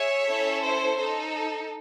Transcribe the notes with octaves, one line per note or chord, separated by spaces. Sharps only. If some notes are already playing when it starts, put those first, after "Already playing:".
Already playing: G#4 C#5 E5
C#4 E4 A4
C5
D#4 A4